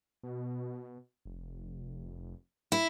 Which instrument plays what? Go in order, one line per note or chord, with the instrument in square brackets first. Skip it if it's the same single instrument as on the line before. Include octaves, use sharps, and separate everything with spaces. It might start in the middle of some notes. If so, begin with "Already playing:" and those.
[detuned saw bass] B2
F1
[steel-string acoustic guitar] E4